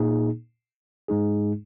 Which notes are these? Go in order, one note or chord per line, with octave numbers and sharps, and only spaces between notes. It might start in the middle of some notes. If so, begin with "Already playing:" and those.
Already playing: A#2 A#3 D#4 G#4
G#2 G#3 D#4 G#4